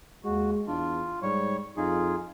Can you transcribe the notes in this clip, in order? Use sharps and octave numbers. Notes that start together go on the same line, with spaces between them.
D#2 G#3 F#4
E2 D4 F4
G#2 G3 C#5 C#6
F2 D#4 F4 G#4